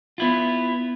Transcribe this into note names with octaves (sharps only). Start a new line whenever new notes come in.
B3 E4 F4